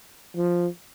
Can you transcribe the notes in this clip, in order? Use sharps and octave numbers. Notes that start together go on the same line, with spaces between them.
F3